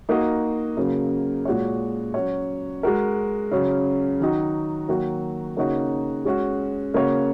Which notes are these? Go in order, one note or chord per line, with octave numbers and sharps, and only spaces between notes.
A#3 D#4 F#4 D#5
C#3 F#3 A#3
A#2 G#3 F#4 C#5
F#3 C#4 F#4 C#5
G#3 F#4 A#4
C#3 F#3 C#4
D#3 F#3 D#4 F#4
D#3 F#3 A#3 F#4 C#5
C#3 A#3 D#4 F#4 C#5
G#3 C#4 F#4
C#3 A#3 F#4 C#5